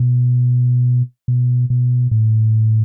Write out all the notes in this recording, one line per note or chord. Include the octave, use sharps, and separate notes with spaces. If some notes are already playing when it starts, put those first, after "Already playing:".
Already playing: B2
B2
B2
A2